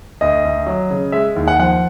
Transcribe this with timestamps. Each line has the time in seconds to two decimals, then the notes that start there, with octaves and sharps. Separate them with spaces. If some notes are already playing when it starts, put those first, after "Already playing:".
0.21 D2 D#5
0.45 D2
0.67 F#3
0.90 C#3
1.12 G#3 E5
1.36 D#2
1.48 F#5
1.59 F3 F#5